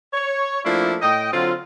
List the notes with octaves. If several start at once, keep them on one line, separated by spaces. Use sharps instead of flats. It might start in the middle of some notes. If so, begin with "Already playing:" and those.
C#5
F3 A3 A#3 D4 E4 F4
A2 D#5 G5
D3 F#3 C4 F4